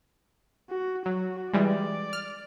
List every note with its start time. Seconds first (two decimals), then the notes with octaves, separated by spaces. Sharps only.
0.70 F#4
1.06 F#3 F#4
1.53 E3 G3 G#3 D5
2.13 F6